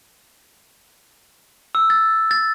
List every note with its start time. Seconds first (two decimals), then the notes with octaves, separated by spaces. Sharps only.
1.75 E6
1.90 A6
2.31 A6